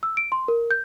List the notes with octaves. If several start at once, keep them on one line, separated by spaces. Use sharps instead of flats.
E6
D7
C6
A#4
G6